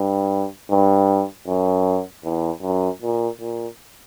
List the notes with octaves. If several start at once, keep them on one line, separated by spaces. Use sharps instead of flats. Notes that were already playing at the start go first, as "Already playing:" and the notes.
Already playing: G2
G2
F#2
E2
F#2
A#2
A#2